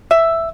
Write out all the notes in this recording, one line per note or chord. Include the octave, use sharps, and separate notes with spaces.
E5